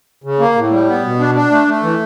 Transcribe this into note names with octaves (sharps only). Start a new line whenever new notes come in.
C#3
A#3
A2
G3
B3
B2
D4
D4
A3
A3
E3